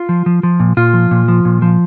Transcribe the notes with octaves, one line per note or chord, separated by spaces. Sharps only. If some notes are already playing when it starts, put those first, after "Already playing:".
Already playing: F4
F3
F3
F3
A#2
A#2 F4
F3
A#2
F3
A#2
F3